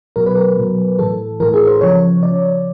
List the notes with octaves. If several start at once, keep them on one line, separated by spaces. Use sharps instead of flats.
B2 F#3 A#4
B4
A#4
B2 F#3
A2 E3 A4
A2 E3 A#4
G#4
C5
C#3 F3 C#5
C#3 F3 D5